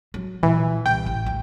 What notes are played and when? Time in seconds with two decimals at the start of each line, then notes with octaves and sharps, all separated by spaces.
0.14 F#3
0.43 A#2 E3
0.86 C2 G5
1.06 A1
1.26 D2